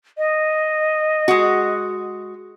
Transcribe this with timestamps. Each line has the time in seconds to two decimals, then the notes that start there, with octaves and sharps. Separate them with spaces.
0.18 D#5
1.28 G#3 F#4